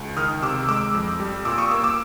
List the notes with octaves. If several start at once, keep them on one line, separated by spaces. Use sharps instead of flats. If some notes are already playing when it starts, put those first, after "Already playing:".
Already playing: C#2
D#3 D#6 F6
C3 D6 E6
G#3 D6 E6
F2
G3
A#2 D6 E6
C#6 D#6
A#3 D6 E6
D6 E6